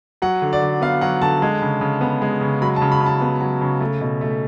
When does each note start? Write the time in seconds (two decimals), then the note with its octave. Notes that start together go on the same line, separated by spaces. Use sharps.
0.22 F#3 F#5
0.42 D3
0.53 D5
0.62 D3
0.81 B3 F5
1.01 F#3 F#5
1.21 D3 A5
1.42 G#3
1.62 C#3
1.81 C#3
2.01 B3
2.22 G#3
2.41 C#3
2.62 F#3 B5
2.76 A5
2.82 C#3
2.92 B5
3.01 C#3
3.06 A5
3.22 B3
3.41 F#3
3.61 C#3
3.80 A3
4.01 B2
4.21 A3